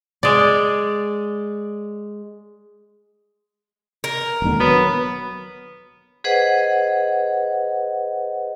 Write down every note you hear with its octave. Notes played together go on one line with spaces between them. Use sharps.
G#3 D5
A#4
E1 D#2 D3
F#3 B3
G#4 B4 C5 D#5 F#5